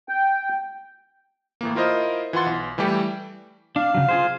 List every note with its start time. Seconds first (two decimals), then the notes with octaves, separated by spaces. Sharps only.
0.09 G5
1.61 A2 E3 A#3
1.75 E4 F4 A#4 C5 D#5
2.33 E3 F4 F#5 C6 A6
2.46 B1
2.78 E3 G3 A3 G4 D5
3.76 D4 F5
3.94 C#3 F#3
4.09 F4 G#4 C5